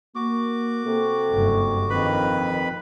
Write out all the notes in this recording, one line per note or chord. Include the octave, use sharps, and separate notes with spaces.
A#3 F#4 D6
C3 A4
F#1 G2
A#1 F2 D#3 B4 B5